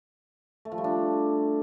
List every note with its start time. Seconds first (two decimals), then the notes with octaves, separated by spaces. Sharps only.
0.65 A3
0.72 F3
0.78 G3
0.84 D4